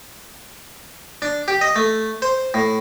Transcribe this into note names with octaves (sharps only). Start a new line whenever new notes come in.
D4
G4
D#5
A3
C5
A2